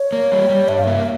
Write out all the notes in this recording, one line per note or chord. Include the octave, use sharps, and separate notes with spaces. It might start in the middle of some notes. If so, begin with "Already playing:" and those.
Already playing: C#5
A#3
G3
G3
G2 E5
F5
A#3 E5